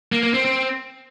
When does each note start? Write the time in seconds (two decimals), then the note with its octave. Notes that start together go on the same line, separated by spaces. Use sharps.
0.12 A#3
0.23 A#3
0.34 C4
0.45 C4